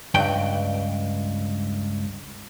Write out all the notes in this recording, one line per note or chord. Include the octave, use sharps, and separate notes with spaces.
C#2 G2 G5